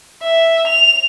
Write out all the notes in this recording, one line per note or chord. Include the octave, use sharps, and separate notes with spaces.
E5
F7